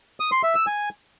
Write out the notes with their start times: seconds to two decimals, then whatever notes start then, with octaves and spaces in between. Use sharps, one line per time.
0.20 D#6
0.32 C6
0.43 E5
0.55 E6
0.67 G#5